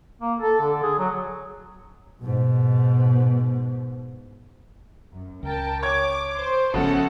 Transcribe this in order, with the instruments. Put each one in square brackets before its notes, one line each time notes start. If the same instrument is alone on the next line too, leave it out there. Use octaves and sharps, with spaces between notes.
[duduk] A#3
A4
D3
G#4
F#3
[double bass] G#2 B2
[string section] F#2
[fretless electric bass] C#2 [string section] A#4 G5 A5
[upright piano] C#5 G#6 [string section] D6
[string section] C5
[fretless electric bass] G#1 F3 B3 [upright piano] C#3 A3 F#4 [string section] A4 F#5